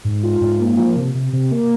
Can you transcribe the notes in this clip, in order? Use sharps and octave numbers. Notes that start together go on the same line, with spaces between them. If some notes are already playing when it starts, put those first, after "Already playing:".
G#2
F4
G#2
A#3
F3
C3
C3
C3
A#3